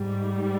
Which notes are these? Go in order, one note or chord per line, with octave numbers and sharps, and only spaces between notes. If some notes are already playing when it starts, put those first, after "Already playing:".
Already playing: G#2 G3